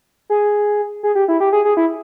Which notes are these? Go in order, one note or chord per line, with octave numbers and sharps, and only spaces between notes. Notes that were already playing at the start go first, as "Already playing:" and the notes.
G#4
G#4
G4
E4
G4
G#4
G#4
E4